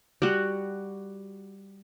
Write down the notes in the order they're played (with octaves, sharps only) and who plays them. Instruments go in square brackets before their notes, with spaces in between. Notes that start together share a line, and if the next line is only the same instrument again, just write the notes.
[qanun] G3 F#4